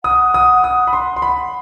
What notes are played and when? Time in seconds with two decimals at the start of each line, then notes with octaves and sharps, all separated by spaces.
0.04 F#5 D#6
0.34 D#6
0.64 D#6
0.87 B5
0.93 C6
1.16 C6
1.22 B5